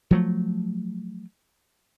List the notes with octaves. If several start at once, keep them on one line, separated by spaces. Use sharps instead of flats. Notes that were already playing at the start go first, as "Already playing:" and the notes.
F3 F#3 A3